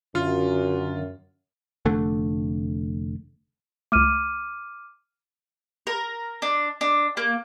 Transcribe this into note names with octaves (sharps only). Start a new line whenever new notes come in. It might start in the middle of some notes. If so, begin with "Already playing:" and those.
F#2 D3 F4
F1 D3 A3 D4
C#2 A3 D6 F6 D#7
A#4
D4
D4
A#3